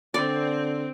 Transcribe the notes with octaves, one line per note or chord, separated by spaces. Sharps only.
D3 C4 D5